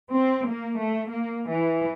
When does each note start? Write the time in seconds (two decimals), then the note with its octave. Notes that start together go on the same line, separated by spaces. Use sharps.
0.13 C4
0.49 A#3
0.80 A3
1.10 A#3
1.49 E3